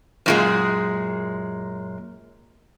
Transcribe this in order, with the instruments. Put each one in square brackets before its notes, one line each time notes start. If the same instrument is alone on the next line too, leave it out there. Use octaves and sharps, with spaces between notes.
[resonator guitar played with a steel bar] F#2 A#2 G#3